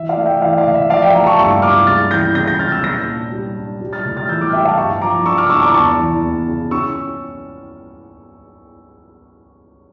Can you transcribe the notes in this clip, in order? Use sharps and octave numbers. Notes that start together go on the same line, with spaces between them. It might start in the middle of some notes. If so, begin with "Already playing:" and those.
Already playing: E3 E5
D5 F5
A3
E5 G5
E3 D5 F5
D5 F5
A2
E5
F3 D5 F5
E5 G5
A3 G5 A#5
A5 C#6
G2 C#6 E6
G2 D6 F6
C#3 F6 A6
E3 G6 A#6
C#3 G6 A#6
G6 A#6
C#4 F6 A6
E6 G6
A#2 G6 A#6
D4
G3
D4
G3
F6 A6
A2
F6 A6
E3 E6 G6
D6 F6
G3 E5 G5
F5 A5
G2 A5 C#6
F3 A#5 D6
D4 C#6 E6
D6 F6
D4 C#6 E6
A#5 D6
E2 A5 C#6
E3
E2
C#3
C#4 C#6 E6